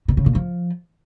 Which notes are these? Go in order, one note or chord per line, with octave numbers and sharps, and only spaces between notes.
B2
C#3
A#2
F3